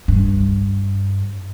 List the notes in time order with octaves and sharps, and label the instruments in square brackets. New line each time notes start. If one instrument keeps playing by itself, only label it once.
[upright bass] G2